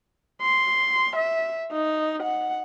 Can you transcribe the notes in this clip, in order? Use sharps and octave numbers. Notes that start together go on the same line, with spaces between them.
C6
E5
D#4
F#5